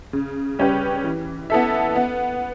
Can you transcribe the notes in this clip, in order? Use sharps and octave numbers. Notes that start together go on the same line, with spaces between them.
C#3
G3 C#4 G4 B4
E3
B3 E4 A4 E5
B3